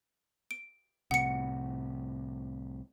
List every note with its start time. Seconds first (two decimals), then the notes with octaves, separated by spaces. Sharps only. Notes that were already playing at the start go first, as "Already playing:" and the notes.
0.51 D7
1.11 C2 A2 C3 F#5 C#7